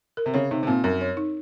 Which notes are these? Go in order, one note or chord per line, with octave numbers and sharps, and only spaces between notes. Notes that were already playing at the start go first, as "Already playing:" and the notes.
A#4
C3
C#3 C#5
C3 D#4
C3
A#2 C4
F#2 A#4
C#5
D#4